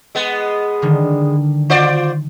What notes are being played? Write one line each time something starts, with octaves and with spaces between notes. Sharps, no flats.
G#3 B3
D3 D#3 G3
F4 C5 D5